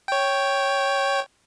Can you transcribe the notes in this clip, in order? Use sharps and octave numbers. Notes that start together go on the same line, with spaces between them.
C#5 G5